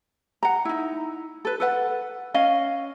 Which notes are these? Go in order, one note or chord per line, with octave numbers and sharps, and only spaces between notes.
F#5 A#5
D#4 E4
A4 B4
A4 B4 F#5
C#4 D#5 F5